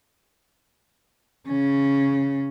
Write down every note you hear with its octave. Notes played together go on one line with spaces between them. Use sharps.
C#3 C#4